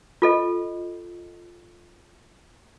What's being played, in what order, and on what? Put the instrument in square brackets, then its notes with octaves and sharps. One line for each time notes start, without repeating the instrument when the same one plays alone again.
[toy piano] F4 A4 D#5